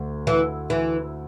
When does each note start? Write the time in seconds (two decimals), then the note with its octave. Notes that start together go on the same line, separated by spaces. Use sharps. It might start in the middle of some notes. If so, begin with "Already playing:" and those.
Already playing: D2
0.27 E3
0.70 E3